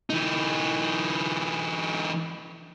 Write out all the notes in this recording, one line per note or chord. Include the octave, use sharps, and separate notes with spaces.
E3 D#4